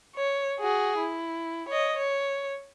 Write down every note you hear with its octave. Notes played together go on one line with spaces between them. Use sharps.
C#5
F#4 G#4
E4
C#5 D#5
C#5